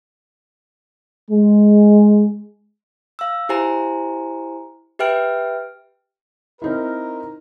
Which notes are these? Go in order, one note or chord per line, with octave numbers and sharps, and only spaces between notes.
G#3
F5 E6
E4 G4 C5 G#5 A#5
G4 B4 E5 G5 F6 D7
C4 D#4 E4 A#4